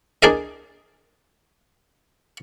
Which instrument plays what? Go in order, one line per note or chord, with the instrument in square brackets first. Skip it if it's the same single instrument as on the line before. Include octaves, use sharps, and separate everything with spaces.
[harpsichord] D4 G#4 A#4 D5 D#5